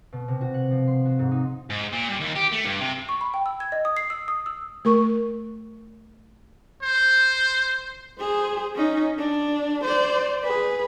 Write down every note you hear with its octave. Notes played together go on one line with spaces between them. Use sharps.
B2
C3
F#4
F#5
F3
C6
F#4
G#2
D#4
G#2
A#2
G2
D#2
G4
A3
G2
C3
C#6
B5
G5
E6
G#6
D#5
D#6
C7
E6
D#6
E6
A3 A#4 C#6
C5
G#4 C5
C#4 D#4
D4
C5 D5
G#4 B4